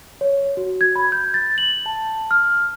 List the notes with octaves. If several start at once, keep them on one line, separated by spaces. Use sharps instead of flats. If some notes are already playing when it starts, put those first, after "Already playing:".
C#5
F#4
G#6
B5
G6
A6
F#7
A5
F6